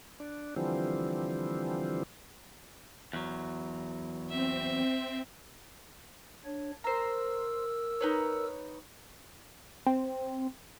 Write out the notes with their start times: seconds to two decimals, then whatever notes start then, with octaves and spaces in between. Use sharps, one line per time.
0.20 D4
0.56 D3 E3 F3 G3 C4
3.13 E2 F#3
4.30 C4 E5
6.45 D4 C#5
6.84 A#4 C5 A#5 E6
8.01 D#4 B4 C#5
9.87 C4